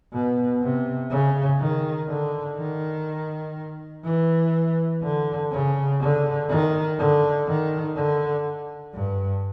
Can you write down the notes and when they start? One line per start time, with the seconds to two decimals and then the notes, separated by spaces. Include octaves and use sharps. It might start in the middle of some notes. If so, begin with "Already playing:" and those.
0.13 B2
0.61 C3
1.10 C#3
1.59 D#3
2.08 D3
2.57 D#3
4.04 E3
5.02 D3
5.51 C#3
6.00 D3
6.49 D#3
6.98 D3
7.47 D#3
7.96 D3
8.94 G2